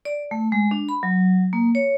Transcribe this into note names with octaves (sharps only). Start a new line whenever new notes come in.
D5
A3
G#3
D4
B5
F#3
A#3
C#5